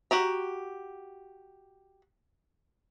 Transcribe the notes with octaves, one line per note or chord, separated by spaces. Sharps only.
F#4 G4 A#5